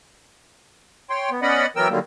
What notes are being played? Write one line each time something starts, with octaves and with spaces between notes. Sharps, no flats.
C#5 G5 C6
B3
B3 C#4 D5 D#5 F#5 B5
E3 F#3 B3 A#4 G5 E6
D3 D#3 F#3 G3 A#3